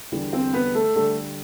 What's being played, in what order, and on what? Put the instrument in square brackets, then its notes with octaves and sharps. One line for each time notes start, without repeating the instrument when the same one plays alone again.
[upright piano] E2 D3 G3
C4 C5
B3 B4
A3 A4
D3 G3 A3 A4